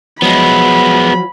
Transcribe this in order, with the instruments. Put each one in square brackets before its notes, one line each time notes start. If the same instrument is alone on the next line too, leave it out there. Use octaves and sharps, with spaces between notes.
[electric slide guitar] F3 F#3 [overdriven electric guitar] G#3 B3 [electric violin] B5